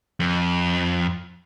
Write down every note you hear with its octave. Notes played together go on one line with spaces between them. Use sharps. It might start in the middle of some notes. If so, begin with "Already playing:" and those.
F2